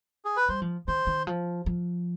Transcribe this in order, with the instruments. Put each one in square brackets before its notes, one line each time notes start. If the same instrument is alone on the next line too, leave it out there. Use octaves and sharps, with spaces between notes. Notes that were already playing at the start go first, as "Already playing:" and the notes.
[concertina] G#4
B4
[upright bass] G3 [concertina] C5
[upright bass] F3
[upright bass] D#3 [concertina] C5
[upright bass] D#3
F3
F3